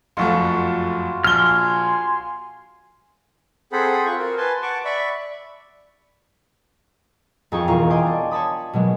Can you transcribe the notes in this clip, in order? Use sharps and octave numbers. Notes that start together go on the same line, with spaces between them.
F#1 F2 A3 F4 F#4
A#1 G#5 C6 F6 G7
C4 G#4 A4 C5 F#5 B5
F4 C#6
F#4 A#4
B4 G#5 A5 C6
F#5 A5 C#6 D6
D5 E5 B5 C#6
F2 D#4 G#4 G5 C#6
E1 F4 F5 A#5 C#6
D#5 G5 G#5 C6 D6 C7
D4
C#5 A5 B5 D#6
B2 F#3 G#3